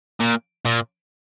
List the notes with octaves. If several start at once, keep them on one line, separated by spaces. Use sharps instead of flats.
A#2
A#2